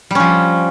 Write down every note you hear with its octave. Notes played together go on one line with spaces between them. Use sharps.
F3 G3 C#4